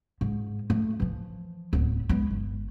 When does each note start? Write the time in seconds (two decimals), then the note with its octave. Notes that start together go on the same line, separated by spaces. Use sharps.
0.21 G#2
0.70 A3
1.00 E3 F3
1.73 D1 B3
2.09 G#3 B3
2.31 G1